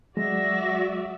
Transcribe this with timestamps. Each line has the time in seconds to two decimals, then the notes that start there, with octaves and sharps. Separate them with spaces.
0.17 F#3 G#3 F#4 D5 E5 A#6